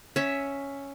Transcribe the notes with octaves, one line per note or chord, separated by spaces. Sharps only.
C#4 E5